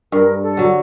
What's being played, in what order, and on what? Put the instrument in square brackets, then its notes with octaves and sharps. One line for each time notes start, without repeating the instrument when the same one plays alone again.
[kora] G2 [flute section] A#4
[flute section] A4
[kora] D3 F#3